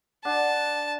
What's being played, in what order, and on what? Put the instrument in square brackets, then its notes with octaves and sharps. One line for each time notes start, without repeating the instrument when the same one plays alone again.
[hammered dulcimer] D4 F#5 [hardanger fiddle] A5